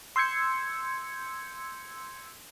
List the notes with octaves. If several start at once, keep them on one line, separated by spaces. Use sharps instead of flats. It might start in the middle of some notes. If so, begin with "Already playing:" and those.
C6 E6 G6 G#6 C#7